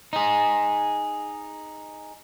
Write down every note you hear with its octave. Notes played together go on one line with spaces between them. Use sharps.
D#4 G#4